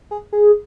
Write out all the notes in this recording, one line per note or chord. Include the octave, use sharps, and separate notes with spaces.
G#4
G#4